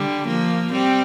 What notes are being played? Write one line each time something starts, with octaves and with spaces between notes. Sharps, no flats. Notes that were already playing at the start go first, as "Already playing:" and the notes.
Already playing: D3 G3
F3 A#3
G3 C4